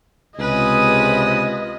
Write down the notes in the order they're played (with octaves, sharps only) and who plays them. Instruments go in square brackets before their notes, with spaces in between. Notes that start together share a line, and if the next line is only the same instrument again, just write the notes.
[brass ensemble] C#2 C3 [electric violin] F4 D#5 [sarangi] B4 [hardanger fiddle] G#5 D#6